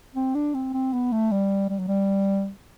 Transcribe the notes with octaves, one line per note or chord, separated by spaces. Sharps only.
C4
D4
C4
C4
B3
A3
G3
G3
F#3
G3